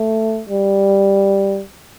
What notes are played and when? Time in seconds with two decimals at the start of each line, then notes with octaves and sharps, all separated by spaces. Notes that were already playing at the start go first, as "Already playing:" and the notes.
Already playing: A3
0.49 G3